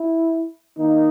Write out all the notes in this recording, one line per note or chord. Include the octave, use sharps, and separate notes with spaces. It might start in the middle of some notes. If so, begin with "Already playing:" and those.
Already playing: E4
D#3 A#3 D#4